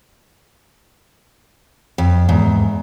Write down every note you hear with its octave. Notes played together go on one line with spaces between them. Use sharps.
F2
E2 G#2